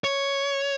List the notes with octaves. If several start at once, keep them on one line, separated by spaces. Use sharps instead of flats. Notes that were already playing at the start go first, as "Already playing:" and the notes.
C#5